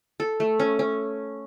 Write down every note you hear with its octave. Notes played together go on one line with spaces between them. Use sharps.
A4
A3
C#4
C#4